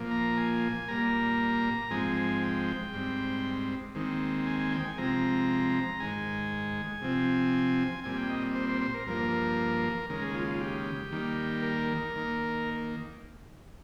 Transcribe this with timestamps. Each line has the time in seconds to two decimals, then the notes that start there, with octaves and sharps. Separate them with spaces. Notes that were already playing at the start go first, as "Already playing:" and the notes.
Already playing: A#2 F3 A#3
0.11 A#5
0.38 G#5
0.88 A#2 G3 A#3 A#5
1.90 G#2 F3 G#3 C4 G#5
2.17 G#5
2.42 G5
2.93 G#2 G3 C4
3.95 D#2 D#3 G#3 C4
4.47 G#5
4.60 G#5
4.72 G5
4.85 G#5
4.98 C3 F3 G#3 C4 A#5
6.00 G#2 D#3 G#3 G#5
7.02 C3 F3 C4
8.04 A#2 G3 C4 G#5
8.17 G5
8.30 D#5
8.55 C5
8.69 C5
8.81 C5
8.94 A#4
9.07 G2 F3 A#3 A#4
10.09 D#2 C#3 G#3 A#4
10.22 G#4
10.34 F4
10.48 F4
10.61 G4
11.11 D#2 D#3 G3 A#3
11.62 A#4
12.16 D#3 A#3